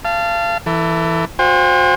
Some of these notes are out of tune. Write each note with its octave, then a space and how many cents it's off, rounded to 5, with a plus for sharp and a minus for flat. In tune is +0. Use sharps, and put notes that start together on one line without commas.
F5 -30 A5 +0
E3 +5 A4 +30
F#4 -35 C5 +0 G5 +40